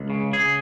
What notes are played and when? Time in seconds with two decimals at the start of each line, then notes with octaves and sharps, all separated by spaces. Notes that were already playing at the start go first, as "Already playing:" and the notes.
Already playing: C#2
0.10 C#3
0.33 C#3 G#4